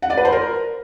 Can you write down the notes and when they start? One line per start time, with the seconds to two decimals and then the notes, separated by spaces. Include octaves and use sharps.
0.02 F#5
0.10 D5
0.17 B4
0.25 C5
0.32 A#4